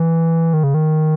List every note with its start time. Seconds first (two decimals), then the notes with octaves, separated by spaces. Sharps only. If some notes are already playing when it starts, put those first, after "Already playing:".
Already playing: E3
0.53 D#3
0.64 C#3
0.74 D#3